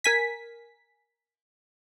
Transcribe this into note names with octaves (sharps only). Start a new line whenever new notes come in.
A#4 G#5 B6